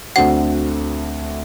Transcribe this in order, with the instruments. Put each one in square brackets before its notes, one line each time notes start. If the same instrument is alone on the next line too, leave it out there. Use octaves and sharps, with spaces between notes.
[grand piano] D2 D3 A3 C4 F#4 [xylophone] F#5